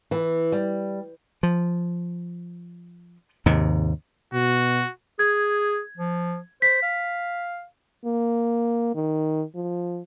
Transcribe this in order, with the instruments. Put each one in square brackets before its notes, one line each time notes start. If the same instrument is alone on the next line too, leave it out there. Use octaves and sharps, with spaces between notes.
[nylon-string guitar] E3
G3
[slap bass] F3
D#2 G#2 C3
[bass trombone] B2 [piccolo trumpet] F#4
[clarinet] G#4 [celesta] G#6
[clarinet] F3
[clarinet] C5 [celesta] B6
[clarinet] F5
[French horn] A#3
D#3
F3